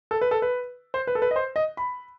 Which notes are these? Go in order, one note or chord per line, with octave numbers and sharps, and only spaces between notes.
A4
B4
A4
B4
C5
B4
A4
B4
D#5
C5
D#5
B5